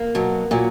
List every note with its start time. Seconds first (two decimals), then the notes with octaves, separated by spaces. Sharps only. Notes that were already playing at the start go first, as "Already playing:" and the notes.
Already playing: A#3
0.15 B2 F#3
0.51 A#2 F#3